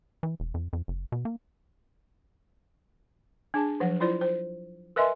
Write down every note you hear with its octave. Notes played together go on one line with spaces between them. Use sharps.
E3
E1
F2
F2
F#1
B2
A#3
D4 G#4 A5
F3 F#3 F#5
E4 F4 C5 D5
C5
A#4 B4 D#5 E5 G#5 C6